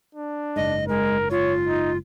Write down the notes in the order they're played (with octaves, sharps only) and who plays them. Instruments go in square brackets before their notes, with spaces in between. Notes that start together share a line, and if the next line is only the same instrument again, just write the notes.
[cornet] D4
[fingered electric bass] F#1 G#2 [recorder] D#5
[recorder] G#3 [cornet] A#4
[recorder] F4 [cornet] C#5
[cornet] D#4